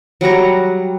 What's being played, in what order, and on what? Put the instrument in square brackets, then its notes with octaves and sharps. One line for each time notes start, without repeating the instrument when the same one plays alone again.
[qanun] F#3 G3 F#5 A#5